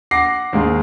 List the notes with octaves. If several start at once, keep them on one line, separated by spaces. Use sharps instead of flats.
F#5 D6 A#6 C7
D#2 G#2 G#3